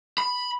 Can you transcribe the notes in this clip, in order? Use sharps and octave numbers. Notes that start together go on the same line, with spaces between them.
B5